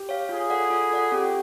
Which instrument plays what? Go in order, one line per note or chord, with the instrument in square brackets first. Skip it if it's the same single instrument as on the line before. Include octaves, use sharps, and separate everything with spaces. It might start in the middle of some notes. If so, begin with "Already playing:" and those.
Already playing: [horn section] G4
[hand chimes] C#5 F5
[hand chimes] F4 [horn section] G#4
[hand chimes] A4 D5 F#5
F4
A4 D5 F#5
[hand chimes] C4 [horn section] G4